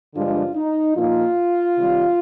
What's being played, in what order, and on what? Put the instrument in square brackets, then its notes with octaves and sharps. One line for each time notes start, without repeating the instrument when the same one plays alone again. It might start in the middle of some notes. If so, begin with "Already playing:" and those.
[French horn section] G2 D3 F3 G#3 D4 F4
D#4
A#2 F3 A#3 D#4 F4
C3 D#3 G3